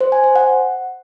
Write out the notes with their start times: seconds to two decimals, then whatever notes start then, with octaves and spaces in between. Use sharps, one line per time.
0.01 C5
0.12 G#5
0.24 C5
0.36 F#5